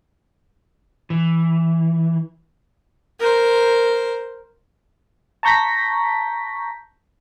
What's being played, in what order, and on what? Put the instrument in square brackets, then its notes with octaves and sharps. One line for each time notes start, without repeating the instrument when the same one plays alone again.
[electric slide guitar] E3
[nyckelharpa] A#4 C5
[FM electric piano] A5 A#5 C#6 G6 A#6 B6